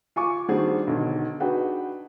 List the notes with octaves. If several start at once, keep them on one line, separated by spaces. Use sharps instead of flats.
F4 G#5 C#6 D6
D#3 G3 C4 D4 F#4 G#4
B1 D3 D#3
D4 D#4 F#4 G#4 B4 G5